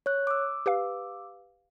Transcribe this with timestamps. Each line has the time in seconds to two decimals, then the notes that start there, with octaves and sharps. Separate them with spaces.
0.06 C#5 F#6
0.27 D6 E6
0.66 G4 B4 F5